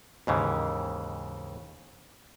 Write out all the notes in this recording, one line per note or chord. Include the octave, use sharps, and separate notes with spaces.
D#2 G#2 C#3 E3